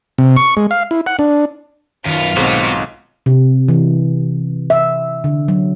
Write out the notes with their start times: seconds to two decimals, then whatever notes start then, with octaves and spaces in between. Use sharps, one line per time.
0.18 C3
0.36 C#6
0.57 G#3
0.71 F5
0.91 E4
1.06 F#5
1.19 D4
2.06 F#2 D#3 B3 F4 F5
2.36 B1 G#2 B3 C4 F#4 A4 C5
3.26 C3
3.69 E3
4.70 E5
5.24 D3
5.48 F#3